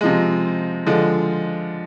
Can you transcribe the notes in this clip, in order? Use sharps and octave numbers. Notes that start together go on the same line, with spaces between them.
C3 F3 G#3
D3 F3 G#3